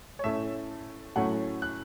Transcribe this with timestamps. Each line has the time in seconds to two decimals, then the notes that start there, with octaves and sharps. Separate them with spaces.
0.19 C#5
0.24 A2 A3 C#4 E5
1.16 A2 F#3 A3 C#4 F#5
1.62 F#6